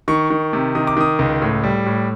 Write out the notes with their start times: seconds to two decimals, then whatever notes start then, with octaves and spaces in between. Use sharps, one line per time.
0.08 D#3 C#6
0.30 D#3
0.53 C3
0.75 D#3 D#6
0.87 D6
0.97 D#3 D#6
1.19 C#2
1.42 A2
1.64 G3
1.86 A2